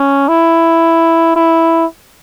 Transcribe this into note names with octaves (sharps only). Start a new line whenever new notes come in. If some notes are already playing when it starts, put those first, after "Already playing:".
Already playing: C#4
E4
E4